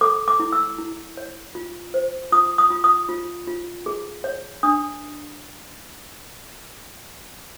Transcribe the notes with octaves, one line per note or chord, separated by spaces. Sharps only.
A4 D6
D6
E4
E6
E4
C#5
F4
C5
F4 D#6
D#6
F4
D#6
F4
F4
G#4
C#5
D4 D#6